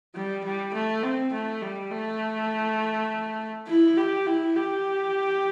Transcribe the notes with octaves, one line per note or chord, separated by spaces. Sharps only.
G3
G3
A3
C4
A3
G3
A3
E4
G4
E4
G4